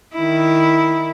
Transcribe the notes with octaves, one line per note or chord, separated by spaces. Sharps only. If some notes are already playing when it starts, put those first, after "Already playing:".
D#3 E4